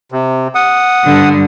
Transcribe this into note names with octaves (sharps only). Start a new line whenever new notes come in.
C3
F#5 D#6
G2 D3